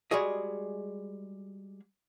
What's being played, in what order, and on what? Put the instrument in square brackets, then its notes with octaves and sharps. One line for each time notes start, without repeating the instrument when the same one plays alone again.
[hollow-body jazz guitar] G3 G#3 F#4 G#4 D#5